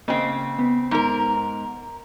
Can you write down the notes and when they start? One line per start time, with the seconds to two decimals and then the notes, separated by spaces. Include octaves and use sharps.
0.08 C#3 A#3 C4 D#5
0.59 B3
0.91 G#2 A#4